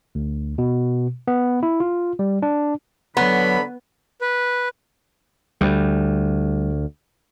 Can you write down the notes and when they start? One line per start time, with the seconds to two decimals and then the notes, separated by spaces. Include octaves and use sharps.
0.15 D2
0.58 B2
1.28 B3
1.63 E4
1.80 F4
2.19 G3
2.42 D4
3.17 D3 F#3 B3 C#5 A#5 B5
4.21 B4
5.61 D2 G3